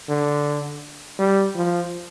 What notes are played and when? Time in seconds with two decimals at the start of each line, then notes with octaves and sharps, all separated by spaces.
0.09 D3
1.19 G3
1.56 F3